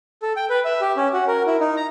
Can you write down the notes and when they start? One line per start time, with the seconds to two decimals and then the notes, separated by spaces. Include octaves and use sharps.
0.22 A4
0.36 G5
0.50 B4
0.65 E5
0.81 G4
0.97 C#4
1.14 F#4
1.28 A#4
1.47 E4
1.60 D#4
1.77 A#5